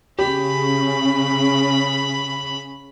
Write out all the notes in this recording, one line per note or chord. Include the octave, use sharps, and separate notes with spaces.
C#3 G4 B5